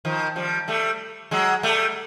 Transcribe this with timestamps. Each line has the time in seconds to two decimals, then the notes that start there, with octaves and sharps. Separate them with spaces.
0.05 D#3 F3
0.36 F3 G3
0.68 G3 A3
1.31 F#3 G#3
1.63 G3 A3